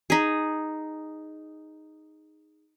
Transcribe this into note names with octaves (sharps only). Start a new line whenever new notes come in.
D#4 G#4